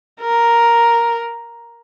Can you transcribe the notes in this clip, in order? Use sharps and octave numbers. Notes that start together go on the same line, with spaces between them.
A#4